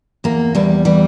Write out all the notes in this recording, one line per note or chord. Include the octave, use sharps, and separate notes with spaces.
E2 A#3
E2 G3
E3 G3